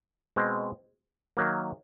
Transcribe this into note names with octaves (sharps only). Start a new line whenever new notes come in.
B2 G#3 C4
D#3 F#3 A#3